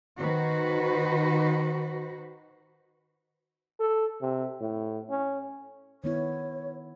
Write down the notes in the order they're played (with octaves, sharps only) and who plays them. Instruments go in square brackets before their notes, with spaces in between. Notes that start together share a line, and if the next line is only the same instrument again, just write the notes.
[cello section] D#3 F#4 B4 C5
[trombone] A4
C3
A2
C#4
[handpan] D#3 B3 E4 [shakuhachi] C#5